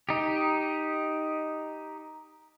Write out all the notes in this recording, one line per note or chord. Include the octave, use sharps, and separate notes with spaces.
D#4 G4